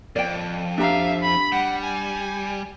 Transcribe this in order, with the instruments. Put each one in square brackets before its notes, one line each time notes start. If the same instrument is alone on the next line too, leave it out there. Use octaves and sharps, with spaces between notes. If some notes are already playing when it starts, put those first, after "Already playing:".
[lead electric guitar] F2 [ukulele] D5 G5
[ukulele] D4 G4 A#5 [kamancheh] E5 F5
[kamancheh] B5
[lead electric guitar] G3 [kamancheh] F#5
[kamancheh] G#5